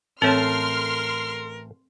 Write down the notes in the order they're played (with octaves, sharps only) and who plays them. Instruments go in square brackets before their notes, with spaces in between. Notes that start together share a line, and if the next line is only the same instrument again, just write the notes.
[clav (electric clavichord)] A1 A3 A5 [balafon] C4 C#5 [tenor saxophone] A#4 [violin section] C6 F6